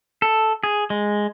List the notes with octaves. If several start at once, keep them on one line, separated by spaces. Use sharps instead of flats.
A4
G#4
G#3